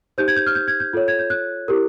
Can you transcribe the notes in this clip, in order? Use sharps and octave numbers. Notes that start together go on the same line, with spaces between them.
D#4 G4 C5 G6
G#6
G6
F6
G6
G#6
G6
F4 A4 C#5
G#6
G6
F#6
E4 G4 A#4